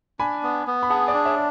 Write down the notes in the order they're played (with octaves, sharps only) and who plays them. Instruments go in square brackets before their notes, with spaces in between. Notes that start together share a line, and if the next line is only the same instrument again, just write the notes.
[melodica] D4 [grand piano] G#5 B5
[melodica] B3
B3
[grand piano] B5
[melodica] G#4 [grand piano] F#5 A5
[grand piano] D5
[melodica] D4
[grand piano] C#5 E5